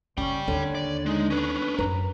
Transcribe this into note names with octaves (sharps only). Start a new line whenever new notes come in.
F#1 C#4 D5 G5
D#2 D3 C#5
D5
G#3 D#4
C#4 D4 B4
F#2 B4 A#5